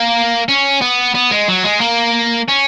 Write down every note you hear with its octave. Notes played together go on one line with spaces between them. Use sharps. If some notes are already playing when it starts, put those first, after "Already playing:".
Already playing: A#3
C#4
B3
B3
G#3
F#3
G#3
A#3
C#4